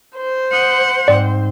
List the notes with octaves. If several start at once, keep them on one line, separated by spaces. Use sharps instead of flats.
C5
F#5 D#6 D#7
G#2 G3 C4 D5